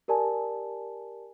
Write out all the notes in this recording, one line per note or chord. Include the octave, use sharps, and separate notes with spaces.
G4 A#4 D5 G#5 A5